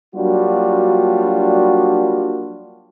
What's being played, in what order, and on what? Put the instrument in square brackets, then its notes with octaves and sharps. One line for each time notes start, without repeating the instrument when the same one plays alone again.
[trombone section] F#3 G3 A#3 D4 F4 F#4